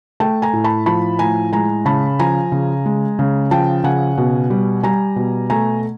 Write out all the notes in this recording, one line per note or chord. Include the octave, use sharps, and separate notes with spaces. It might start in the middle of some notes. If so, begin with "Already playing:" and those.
A3 G5 A5
G#5 A#5
A2
A5 B5
F3 A5 B5
A2 G#5 A#5
G#3 G#5 A#5
C#3 A5 B5
F3 G#5 A#5
C#3
G#3
C#3
F3 G5 A5
C#3 F#5 G#5
B2
G3
G3 G#5 A#5
B2
A3 G#5 A#5